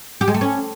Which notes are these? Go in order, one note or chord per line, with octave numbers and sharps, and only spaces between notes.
G4
G#3
A3
C#4